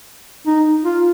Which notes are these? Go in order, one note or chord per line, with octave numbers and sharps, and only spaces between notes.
D#4
F4